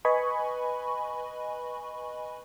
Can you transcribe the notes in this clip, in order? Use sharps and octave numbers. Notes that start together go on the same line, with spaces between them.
B4 D#5 G#5 B5 C#6